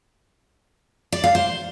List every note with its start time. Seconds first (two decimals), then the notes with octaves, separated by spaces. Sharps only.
1.12 D5
1.24 F5
1.35 C5